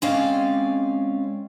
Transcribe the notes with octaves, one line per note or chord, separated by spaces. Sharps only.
G#3 C4 C#4 D5 F5